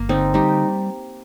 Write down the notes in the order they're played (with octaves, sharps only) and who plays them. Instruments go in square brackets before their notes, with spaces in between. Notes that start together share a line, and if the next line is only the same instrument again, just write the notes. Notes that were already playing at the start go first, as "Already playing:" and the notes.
Already playing: [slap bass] G1 [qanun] A#3
[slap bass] D3 [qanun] C4 D#4
[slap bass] G3 [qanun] D#4 G4